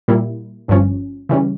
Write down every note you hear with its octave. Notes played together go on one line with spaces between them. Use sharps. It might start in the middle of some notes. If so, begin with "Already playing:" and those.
A#2 G3 A#3 E4
G1 G2 F3 C#4
C#3 E3 G3 C#4